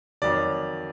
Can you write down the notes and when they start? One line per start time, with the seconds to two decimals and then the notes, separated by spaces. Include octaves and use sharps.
0.22 F2 D#3 F#3 D5